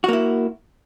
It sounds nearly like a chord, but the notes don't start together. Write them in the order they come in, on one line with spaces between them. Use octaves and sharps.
F#4 A#3 E4